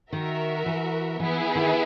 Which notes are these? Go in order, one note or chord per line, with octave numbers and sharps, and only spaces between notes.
D#3 F#4 A#4 E5
E3
E3 B3 E4 G#4
D#3